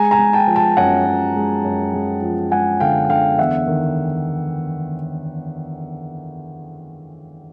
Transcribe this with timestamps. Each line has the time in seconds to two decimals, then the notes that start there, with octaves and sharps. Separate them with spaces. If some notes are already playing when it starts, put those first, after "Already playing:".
Already playing: G#3 G#5 A#5
0.11 G#5 A#5
0.18 G#3
0.33 G5 A5
0.47 F3
0.56 G5 A5
0.77 F#2 F#5 G#5
1.06 F#2
1.36 G#3
1.65 F#2
1.94 G#3
2.22 F3
2.52 G#3 F#5 G#5
2.80 D3 F5 G5
3.09 D3 F5 G5
3.38 E2 E5 F#5
3.67 D#3